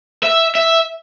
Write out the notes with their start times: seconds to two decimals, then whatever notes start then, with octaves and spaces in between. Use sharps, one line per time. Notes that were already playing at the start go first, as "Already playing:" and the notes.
0.23 E5
0.55 E5